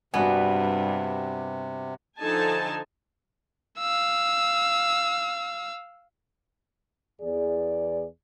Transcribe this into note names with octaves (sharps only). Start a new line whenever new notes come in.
G2 C3 B3 F#4 D5 G#5
D3 F3 D#4 A4 G#5 A5
F5 E6
E2 G#4 D5